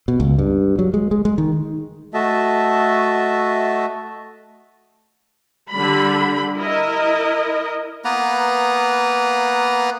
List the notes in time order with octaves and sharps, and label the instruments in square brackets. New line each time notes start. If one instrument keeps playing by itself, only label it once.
[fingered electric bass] B2
C#2
G2
F#3
G#3
G#3
G#3
D#3
[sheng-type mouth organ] A3 F#4 D#5 E5 A5
[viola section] D3 G3 B5
E4 A#4 D#5
[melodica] A#3 B3 B4 A#5